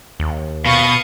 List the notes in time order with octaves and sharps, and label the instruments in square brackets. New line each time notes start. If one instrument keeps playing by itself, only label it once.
[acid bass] D#2
[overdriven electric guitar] B2 [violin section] F5 C#6 D#6